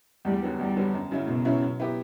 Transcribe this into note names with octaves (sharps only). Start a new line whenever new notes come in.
E2 G3
D3 F#3 B3
E2 G3
D3 F#3 B3
F#2
C#3 F#3 C#4 E4
F#2 B2
C#3 F#3 C#4 E4
F#3
B3 E4 G4